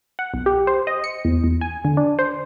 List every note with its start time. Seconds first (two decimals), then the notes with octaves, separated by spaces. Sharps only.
0.19 F#5
0.34 B1
0.46 G4
0.67 C5
0.87 D#5
1.04 C#7
1.25 E2
1.44 E2
1.61 G#5
1.85 D3
1.97 D4
2.19 C5